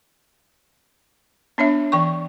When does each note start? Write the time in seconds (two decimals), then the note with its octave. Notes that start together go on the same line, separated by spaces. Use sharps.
1.58 B3 D4 C#5 E5
1.92 E3 G5 C#6